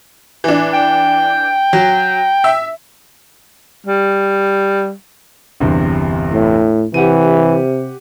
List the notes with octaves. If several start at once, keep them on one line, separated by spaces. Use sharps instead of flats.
E3 D4
G5
F#3
E5
G3
G1 E2 C3
A2
C3 E3 G4 F#5 D#7